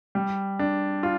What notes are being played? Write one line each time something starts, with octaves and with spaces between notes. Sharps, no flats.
G3
D4
F4